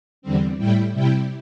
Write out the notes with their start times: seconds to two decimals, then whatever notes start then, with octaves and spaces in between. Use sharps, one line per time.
0.22 E2 D3 G3 C4
0.58 A2 G3 E4 G4
0.93 C3 G3 E4 G4